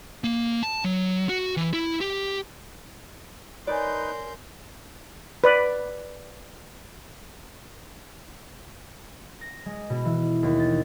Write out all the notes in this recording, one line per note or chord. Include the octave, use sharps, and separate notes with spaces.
A#3
A5
F#3
F#4
E3
E4
G4
D#4 A#4 B4 C#5 D5 G#5 C6 G6
B4 D5
A#6
G#3
B2
E3
D#2
A6